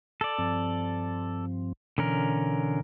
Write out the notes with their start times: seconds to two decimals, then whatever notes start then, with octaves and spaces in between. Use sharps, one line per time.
0.21 A4 D5
0.38 G2 F3 C4
1.98 B2 D3 E3 C#4 A#4